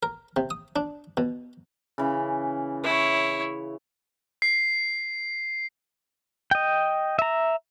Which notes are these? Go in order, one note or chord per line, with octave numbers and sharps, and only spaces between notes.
A#4
C3
D#6
D4
B2
C#3 E3
E4 C#5
C7
D#5 G5
E5 A#5